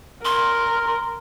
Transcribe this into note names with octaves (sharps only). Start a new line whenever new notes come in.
A#4 C6